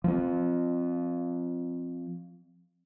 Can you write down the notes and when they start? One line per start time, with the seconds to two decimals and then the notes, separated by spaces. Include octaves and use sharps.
0.04 F3 C4